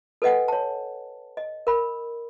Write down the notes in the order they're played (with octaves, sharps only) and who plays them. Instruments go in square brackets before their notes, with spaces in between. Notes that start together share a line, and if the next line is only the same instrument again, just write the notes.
[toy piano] A4 B4 D#5 F#5 G#5
C#5 A5
D#5
A#4 B5